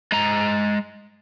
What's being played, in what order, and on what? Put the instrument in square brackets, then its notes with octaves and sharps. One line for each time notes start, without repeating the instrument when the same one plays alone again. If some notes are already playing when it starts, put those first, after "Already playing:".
[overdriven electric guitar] G#3 A#5